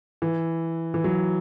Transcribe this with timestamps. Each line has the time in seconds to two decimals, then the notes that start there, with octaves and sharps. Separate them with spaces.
0.22 E3
0.94 E3
1.04 F#3